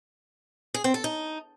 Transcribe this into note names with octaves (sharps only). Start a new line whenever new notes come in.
G#4
C4
A4
D#4